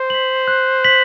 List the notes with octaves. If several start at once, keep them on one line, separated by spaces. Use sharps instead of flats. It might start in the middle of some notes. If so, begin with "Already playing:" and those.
Already playing: C5
B6 F#7
F#6
B6 F#7